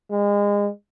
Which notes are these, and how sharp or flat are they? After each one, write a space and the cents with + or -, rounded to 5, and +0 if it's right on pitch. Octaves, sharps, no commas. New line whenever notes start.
G#3 -30